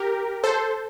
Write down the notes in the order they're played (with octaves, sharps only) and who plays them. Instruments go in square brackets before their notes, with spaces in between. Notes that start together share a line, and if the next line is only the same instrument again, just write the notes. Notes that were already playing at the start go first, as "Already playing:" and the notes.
Already playing: [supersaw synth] G4 A#4
A4 C5